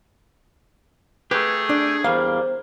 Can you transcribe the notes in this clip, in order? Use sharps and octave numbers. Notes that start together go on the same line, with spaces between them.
A3 G4 G#4 B4
D4
E2 G3 A#3 C5 F5